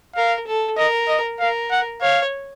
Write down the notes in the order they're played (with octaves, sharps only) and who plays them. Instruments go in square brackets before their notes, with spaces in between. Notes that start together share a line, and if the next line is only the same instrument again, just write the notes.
[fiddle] A#4 [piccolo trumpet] F5
[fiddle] A4
[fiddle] A#4 [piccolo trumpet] D#5
[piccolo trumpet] D#5
[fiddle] A#4 [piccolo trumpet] F5
[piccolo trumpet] F#5
[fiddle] C#5 [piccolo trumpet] F5